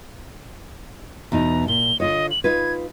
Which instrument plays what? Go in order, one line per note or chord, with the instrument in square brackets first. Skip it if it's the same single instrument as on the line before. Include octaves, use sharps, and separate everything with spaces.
[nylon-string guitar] E2 B2 D#4 [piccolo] A#5
[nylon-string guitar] A#2 [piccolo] G7
[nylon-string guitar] D3 F4 C#5 [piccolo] D#5
[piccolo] F#7
[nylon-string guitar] D#4 F4 B4 [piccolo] G#6